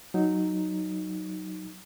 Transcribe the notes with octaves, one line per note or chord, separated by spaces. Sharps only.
F#3 D#4